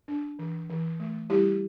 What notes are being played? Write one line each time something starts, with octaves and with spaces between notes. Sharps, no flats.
D4
E3
E3
A3
G3 E4 G4